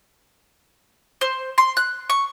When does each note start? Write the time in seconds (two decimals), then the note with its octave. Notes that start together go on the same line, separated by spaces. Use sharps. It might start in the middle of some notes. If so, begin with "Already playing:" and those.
1.21 C5
1.58 C6
1.77 F#6
2.10 C#6